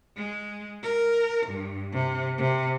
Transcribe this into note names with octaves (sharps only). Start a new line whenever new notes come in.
G#3
A#4
G2
C3
C3